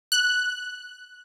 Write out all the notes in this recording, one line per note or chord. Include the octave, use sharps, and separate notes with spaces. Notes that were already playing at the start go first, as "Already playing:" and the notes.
F#6